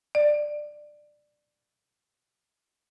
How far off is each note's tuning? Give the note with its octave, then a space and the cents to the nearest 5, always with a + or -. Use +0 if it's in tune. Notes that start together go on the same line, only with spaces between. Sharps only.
D5 +15